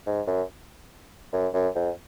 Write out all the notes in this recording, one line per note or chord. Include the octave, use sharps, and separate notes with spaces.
G#2
F#2
F#2
F#2
F2